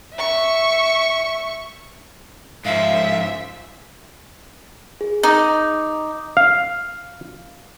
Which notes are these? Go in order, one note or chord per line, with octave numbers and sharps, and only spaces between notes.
E5 C#6
G#2 F3 E5 F5
G#4
D#4 D#5 D6 D#6
F5